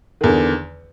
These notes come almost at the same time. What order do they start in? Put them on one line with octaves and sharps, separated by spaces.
D#3 E2 D3